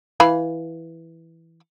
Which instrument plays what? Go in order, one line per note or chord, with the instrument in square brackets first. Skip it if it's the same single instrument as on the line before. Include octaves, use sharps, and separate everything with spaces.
[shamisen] E3 F5 B5